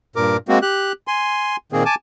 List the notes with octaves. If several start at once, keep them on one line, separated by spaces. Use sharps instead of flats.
G2 A#2 A#4 D6
G#3 A#3 C4 F#4
G4 F#6
G#5 C6
A#2 D#3 A#3 C4 G#4
G#5 A5 D6